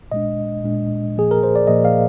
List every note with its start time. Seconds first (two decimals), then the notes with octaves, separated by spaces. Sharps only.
0.12 A#2 G#3 D4 D#5
0.64 A#2 G#3 D4
1.16 A#2 F3 A#3 G#4
1.31 A#4
1.43 C5
1.56 D5
1.67 A#2 F3 A#3 D#5
1.85 F5